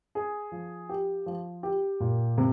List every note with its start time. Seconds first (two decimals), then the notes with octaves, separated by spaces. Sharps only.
0.15 G#4
0.52 F3
0.89 G4
1.26 F3
1.63 G4
2.00 A#2
2.38 C3